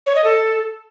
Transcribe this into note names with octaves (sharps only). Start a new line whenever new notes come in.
C#5
D#5
A4